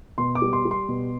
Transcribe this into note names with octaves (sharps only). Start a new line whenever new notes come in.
B2 C6
D6
G3
C6
G3
C6
B2